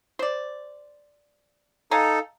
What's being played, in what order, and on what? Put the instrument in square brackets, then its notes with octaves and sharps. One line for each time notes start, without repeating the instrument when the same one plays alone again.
[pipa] C5 D5
[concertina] D#4 A4 [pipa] F5 G#5 A#5